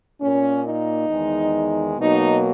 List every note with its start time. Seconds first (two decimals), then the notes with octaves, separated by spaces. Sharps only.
0.21 A#2 A#3 C#4
0.65 D#4
1.09 E2 D#3 G#3
1.97 B2 F#3 A#3 D#4